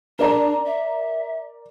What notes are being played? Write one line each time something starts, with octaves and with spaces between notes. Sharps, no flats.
D4 A#4 D5 A#5
E5